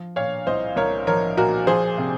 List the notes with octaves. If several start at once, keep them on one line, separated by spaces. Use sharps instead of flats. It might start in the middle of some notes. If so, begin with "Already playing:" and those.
Already playing: F3
A#2 C#5 F5
C2 C5 D#5
C2 A#4 C#5
F3 A#4 C#5
A#2 F#4 A#4
F3 G#4 C5
C3